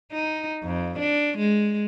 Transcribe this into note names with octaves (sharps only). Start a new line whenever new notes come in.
D#4
F2
D4
G#3